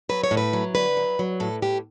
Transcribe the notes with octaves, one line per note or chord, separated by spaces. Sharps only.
F#3 B4
C#5
A2
B4
F#3
D3 B4
F#3
F#3
A2 A4
A2 G4